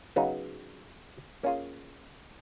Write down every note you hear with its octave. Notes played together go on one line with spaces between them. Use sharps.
C#3 F#3 B3 D#4
A#3 C#4 F4 G#4